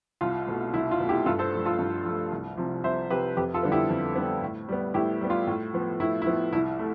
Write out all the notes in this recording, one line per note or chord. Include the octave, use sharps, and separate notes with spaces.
C2 F4
B2 A3
C2 E4
F4
B2 A3
E4 G4
G2 F4 A4
A4 C5
F3 A3
F4 A4
G2
F3 A3
C2
C3 F3
C2 C5 E5
C3 F3 G4 B4
F2 G4 B4
F4 A4
D3 G3 B3
E4 G4
F2
D3 G3 B3
A2
G3 B3
A2 E4 G4
G3 B3
F4
A2
F3 B3
A2 E4
E4
F3 B3
C2 E4
A3